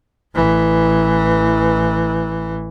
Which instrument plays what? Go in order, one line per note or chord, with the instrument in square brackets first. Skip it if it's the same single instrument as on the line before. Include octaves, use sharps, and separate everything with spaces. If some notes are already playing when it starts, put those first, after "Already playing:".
[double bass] A1 E3